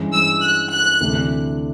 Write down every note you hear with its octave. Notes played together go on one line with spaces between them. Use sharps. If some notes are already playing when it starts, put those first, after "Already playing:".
Already playing: G2 E3 G#3 C#4
E6
F#6
F#6
D2 C3 E3 A3 D4